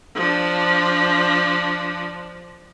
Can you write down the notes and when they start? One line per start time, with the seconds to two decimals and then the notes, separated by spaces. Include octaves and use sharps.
0.15 F3 D4